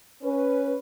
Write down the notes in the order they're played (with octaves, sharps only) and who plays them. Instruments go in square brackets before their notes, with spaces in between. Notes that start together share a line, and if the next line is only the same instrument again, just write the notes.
[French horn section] C#4 B4